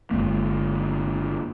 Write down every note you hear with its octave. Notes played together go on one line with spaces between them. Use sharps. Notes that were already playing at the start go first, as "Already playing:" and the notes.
G1 F2 G#3 A#3